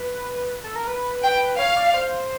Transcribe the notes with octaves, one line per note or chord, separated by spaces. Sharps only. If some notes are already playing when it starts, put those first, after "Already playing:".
Already playing: B4
A4
A#4
B4
G5
C#5 F5
D5
C5